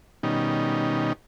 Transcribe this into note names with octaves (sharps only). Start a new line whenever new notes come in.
B2 D#3 G3 C#4 D#4